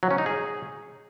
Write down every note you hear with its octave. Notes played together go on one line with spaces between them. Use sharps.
F#3
C#4
D#4
G#4